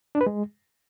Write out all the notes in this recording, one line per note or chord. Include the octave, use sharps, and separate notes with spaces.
D4
B4
G#3